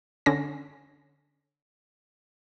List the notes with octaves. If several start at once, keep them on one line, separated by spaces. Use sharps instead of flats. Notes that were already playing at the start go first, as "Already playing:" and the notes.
D3 C#4 A#6